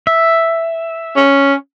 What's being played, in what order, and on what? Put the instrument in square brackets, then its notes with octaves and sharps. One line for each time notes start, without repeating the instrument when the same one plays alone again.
[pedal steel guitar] E5
[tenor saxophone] C#4